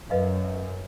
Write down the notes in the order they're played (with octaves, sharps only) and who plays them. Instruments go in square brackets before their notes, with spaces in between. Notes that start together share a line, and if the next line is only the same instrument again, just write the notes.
[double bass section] F#2 [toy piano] B4 D#5 F5